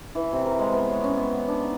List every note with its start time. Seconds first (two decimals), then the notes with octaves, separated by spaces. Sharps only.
0.15 E3
0.33 C3
0.46 A#4
0.59 G#3
0.72 B3
0.90 C#5
1.04 C#4
1.17 B3
1.33 F#5
1.48 D4
1.63 D#4